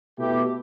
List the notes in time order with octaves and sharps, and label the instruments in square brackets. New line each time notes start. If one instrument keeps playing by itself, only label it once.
[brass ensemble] B2 A3 E4 G4